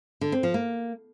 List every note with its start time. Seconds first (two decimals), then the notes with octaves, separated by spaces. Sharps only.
0.21 D3
0.32 C4
0.43 F3
0.54 A#3